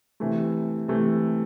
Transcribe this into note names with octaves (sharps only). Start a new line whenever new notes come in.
C3 E3 A3
C3 E3 A3